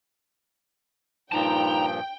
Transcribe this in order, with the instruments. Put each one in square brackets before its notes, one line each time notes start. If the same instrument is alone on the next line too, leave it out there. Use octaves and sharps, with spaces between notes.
[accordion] G2 A#2 F3 [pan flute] D#4 [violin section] G5 [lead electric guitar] A5 A#5